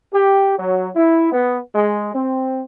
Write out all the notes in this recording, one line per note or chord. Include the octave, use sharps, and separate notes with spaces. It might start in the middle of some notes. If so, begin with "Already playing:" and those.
G4
F#3
E4
B3
G#3
C4